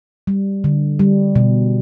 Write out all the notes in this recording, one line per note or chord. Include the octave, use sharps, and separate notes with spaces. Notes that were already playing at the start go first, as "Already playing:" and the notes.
G3
D3
G3
B2